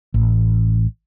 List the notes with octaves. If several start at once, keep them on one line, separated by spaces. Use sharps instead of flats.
A1